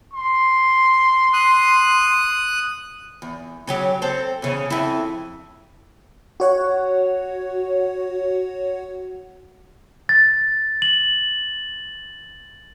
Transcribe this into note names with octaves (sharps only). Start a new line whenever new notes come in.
C6
D#6 F#6
E2
C#3 F#3 G4
C4 A4
E2 C#3
F2 E4
F#4 C#5 F#5
A6
F#7